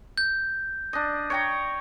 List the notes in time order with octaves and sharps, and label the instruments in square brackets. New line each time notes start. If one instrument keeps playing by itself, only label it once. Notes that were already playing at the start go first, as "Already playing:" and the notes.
[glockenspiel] G6
[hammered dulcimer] D4 D#5
C#5 G5 A#5